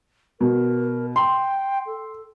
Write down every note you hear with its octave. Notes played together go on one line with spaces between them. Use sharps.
B2 A#4
G5 C6
A4